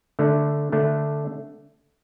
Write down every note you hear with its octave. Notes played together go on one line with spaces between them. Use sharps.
D3 A3 D4
D3 A3 D4